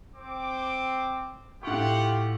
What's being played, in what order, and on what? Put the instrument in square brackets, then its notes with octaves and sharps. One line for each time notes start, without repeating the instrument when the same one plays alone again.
[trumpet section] C4 D6
[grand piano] A2 C#6 [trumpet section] F4 G4 F#5